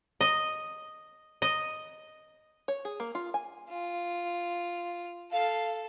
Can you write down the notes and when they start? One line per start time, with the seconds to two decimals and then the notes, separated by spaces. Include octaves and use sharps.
0.21 D#5
1.42 D#5
2.68 C#5
2.85 G#4
3.00 A#3
3.15 F4
3.34 G#5
3.70 F4
5.32 A4 F5